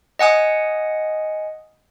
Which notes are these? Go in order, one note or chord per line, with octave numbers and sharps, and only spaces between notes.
D#5 F#5 G#5 D#6